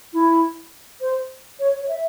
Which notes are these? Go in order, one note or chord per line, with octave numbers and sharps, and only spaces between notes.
E4
C5
C#5
C#5
E5